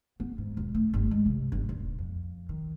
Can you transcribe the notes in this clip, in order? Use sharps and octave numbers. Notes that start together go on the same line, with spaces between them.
B3
G#2
E1
A3
G1
G#3
C3
G1
D#1
F2
D#3